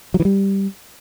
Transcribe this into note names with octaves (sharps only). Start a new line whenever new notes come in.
F#3
E3
G3